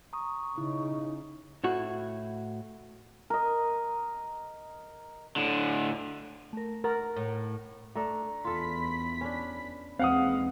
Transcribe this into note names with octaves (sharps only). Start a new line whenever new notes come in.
A#5 C#6 D#6
C#3 D#4 E4
A2 E4 F#4
A#4 D#5
A2 D3
A3 A#4
A#4 F#5 A#5 A6
A2
A3 D4 A4 A#5
E2 F4 A4 B5 B6
C#4 D4
D#2 E3 G#3 C4 F5 F#5 D#6